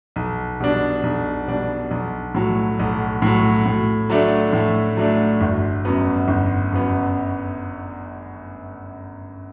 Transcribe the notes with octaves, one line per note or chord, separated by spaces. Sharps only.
B1
B2 G3 D4
B1
B2 G3 D4
B1
A2 F#3
B1
A2 F#3
A2
F#3 A3 D4
A2
F#3 A3 D4
G1
F#2 F#3 B3
G1
F#2 F#3 B3